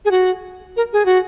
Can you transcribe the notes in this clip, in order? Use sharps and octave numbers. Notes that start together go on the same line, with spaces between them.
G#4
F#4
A#4
G#4
F#4